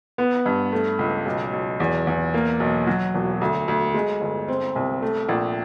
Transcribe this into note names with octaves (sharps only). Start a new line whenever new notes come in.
B3
G2
A3
C#2
B1
B1
E2
E2
A#3
B1
F#3
E1
D2
D2
G#3
G1
C4
C2
A3
A#1